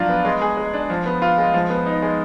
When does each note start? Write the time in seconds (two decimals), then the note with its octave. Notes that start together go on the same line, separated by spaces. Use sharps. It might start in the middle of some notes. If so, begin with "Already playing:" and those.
Already playing: F3 F#3 D4 F4
0.09 B3
0.25 G#3
0.42 G#4
0.57 G#3
0.73 D4
0.90 F3
1.06 B3
1.22 F4
1.38 G#3
1.54 F3
1.70 B3
1.86 D#4
2.02 G#3